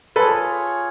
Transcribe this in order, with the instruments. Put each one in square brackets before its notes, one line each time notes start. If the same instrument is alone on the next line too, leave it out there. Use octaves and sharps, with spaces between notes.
[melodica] F4 G#4 C#5 [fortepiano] A4 B4